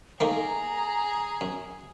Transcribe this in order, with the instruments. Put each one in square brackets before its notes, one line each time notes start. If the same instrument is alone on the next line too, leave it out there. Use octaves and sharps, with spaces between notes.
[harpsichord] D#3 A3 A#3 [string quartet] G#4 [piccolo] A#5
[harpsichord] F#2